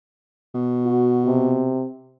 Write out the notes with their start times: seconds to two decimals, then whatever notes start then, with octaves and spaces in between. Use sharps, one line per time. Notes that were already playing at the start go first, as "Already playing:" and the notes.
0.55 B2
0.86 F#4
1.26 C3